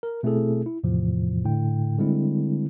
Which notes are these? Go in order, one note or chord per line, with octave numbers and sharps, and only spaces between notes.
A#4
B2 A3 C4 E4 G#4 A4
E4
E2 A2 C3 E3 F3
A2 D3 G5
D3 G3 G#3 C4 E4